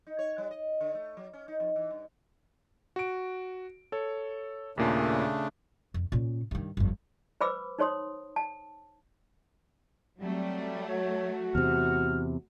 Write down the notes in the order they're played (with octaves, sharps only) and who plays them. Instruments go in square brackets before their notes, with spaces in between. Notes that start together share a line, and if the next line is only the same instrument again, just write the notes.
[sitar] D#4
C#5
G3
D#5
D3
A3
F#3
C#4
D#4
F2
E3
G2
[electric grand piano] F#4 D7
A4 C#5
[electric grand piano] D#2 A#2 C7 [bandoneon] C#3 A3 D4
[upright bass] F2
A#2 C#4
G2 D#3
G1 F2
[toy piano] B4 C5 B5 D6 E6
D#4 C5 C#5 C6 D#6
A5
[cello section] F#3 A3 [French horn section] G3 [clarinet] C4
[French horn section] F#4 [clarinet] C#5
[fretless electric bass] E2 C3 [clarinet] F6